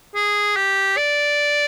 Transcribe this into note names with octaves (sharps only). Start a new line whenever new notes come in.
G#4
G4
D5